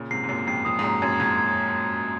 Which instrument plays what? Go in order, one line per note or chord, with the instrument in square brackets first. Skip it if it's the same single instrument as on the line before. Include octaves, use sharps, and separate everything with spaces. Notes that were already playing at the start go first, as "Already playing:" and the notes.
Already playing: [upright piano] A#2 C#3
[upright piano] G#2 C3 [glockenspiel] C7
[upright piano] G#2
[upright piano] F#2 A#2 [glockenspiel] C7
[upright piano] F2 G#2 [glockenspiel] C7
[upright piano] F2 [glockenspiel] D#6
[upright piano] G#2
[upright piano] F#2 [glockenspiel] A#5
[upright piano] F#2 [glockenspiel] G#6
[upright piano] F2 G#2 [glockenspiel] G#6
[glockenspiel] G#6